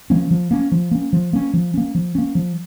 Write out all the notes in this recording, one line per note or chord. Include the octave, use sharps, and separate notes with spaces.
F3 A#3 C#4
F3
A#3 C#4
F3
A#3 C#4
F3
A#3 C#4
F3
A#3 C#4
F3
A#3 C#4
F3